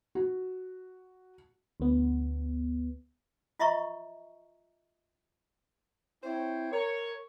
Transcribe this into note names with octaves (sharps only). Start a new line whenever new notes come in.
F#4
D2 B3
F4 D#5 E5 A#5 C6 C#6
C4 E4 C5 C#5 G5
A#4 C#5